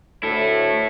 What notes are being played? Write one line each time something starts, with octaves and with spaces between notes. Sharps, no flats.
D2 A3 E4 A4 C#5